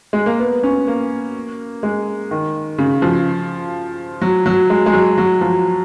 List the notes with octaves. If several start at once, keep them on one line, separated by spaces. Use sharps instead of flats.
G#3
A#3
B3
C#4
A#3
G#3
D#3
C#3
F3
F#3
F#3
G#3
G#3
F#3
F#3
F3